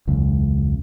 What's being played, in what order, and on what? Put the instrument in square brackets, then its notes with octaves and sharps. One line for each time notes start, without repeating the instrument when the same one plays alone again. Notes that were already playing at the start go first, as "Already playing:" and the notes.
[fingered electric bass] E1 C#2 F#2